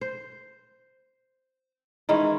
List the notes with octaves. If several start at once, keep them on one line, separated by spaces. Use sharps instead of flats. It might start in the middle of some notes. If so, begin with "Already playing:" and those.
C5
D#3 E3 G#3 C#4